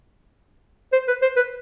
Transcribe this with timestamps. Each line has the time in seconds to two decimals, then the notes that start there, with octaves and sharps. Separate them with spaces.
0.93 C5
1.08 B4
1.22 C5
1.36 B4